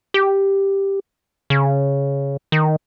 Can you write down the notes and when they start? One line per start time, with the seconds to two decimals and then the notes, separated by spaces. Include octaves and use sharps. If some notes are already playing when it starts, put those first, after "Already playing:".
0.14 G4
1.50 C#3
2.52 D#3